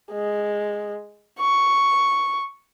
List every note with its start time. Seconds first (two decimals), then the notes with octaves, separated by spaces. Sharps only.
0.13 G#3
1.40 C#6